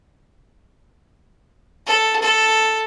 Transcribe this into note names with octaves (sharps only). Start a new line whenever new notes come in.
A4
A4